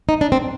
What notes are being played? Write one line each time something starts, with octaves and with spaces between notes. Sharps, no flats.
D#4
D4
C4